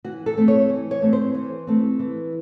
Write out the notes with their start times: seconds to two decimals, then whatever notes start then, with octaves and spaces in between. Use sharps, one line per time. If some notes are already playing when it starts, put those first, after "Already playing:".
0.04 E3 F#4
0.26 A4
0.37 A3 C4
0.48 C#5
0.70 E3
0.91 C#5
1.02 A3 C4
1.13 C5
1.34 E3
1.67 A3 C4
1.99 E3